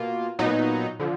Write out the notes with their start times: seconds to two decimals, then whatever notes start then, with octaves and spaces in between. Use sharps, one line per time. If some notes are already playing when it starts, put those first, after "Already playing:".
Already playing: B2 A#3 F4
0.39 A#2 F#3 B3 D#4
0.99 D3 F3